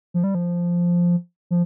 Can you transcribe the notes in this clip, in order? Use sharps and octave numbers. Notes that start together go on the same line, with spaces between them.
F3
G3
F3
F3